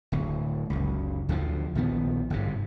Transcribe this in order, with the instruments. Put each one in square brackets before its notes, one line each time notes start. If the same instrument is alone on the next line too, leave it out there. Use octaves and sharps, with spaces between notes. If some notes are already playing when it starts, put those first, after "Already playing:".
[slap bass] D1 D2
F#1 C#2
D2 D3 E3 F3
A#1 D#3 F#3 B3
G1 G#2 C3